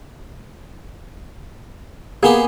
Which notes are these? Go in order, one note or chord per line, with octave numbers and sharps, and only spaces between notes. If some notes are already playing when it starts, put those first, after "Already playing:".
A#3 B3 G4 G#4